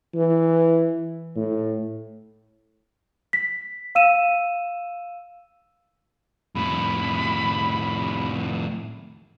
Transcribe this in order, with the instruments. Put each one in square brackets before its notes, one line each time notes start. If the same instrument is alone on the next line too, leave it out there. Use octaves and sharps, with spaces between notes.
[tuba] E3
A2
[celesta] B6
F5 E6 D#7 E7
[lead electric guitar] F2 A2 [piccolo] B5